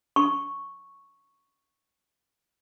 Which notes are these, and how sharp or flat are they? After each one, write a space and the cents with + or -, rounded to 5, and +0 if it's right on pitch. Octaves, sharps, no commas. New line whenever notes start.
C#6 -5